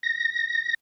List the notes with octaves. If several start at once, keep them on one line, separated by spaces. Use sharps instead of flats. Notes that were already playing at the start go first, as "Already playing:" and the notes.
A#6